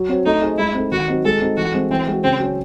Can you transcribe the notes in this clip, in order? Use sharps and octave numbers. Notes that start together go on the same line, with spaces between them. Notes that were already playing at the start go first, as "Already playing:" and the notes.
Already playing: F#3
C4 F#4 C#5
A3 D#4
D#4 G#4 C5
G#3 E4
C4 D#4 A4
D#3 F#4
F#3 C4 D#4
G#3 A4
C4 D#4 F#4
E3 F#4
G#3 C4
E3 C4
G#3 C4 F#4
C#3 C4
F#3 C#4